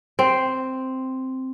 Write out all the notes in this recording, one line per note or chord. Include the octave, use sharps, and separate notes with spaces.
C4